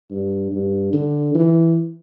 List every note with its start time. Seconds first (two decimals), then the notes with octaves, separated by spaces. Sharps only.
0.11 G2
0.52 G2
0.93 D3
1.35 E3